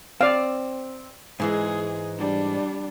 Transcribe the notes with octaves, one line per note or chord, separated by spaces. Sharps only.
C4 D5 F5
G#2 E3 G#3 G#4
G3 D4